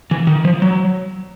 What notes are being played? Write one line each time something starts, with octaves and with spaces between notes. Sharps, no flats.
E3
D#3
F3
F#3